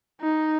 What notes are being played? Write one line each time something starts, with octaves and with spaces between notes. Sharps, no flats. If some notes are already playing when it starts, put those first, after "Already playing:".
D#4